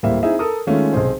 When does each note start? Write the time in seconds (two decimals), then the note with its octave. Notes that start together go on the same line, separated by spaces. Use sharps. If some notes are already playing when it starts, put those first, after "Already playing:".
0.03 D1 G3 A#3 C5 E5
0.23 C4 D#4 E4 G#4 E5
0.39 A4 A#4 D#6
0.67 D#3 G#3 A3 C#4 F4
0.93 B1 C3 G#4 C5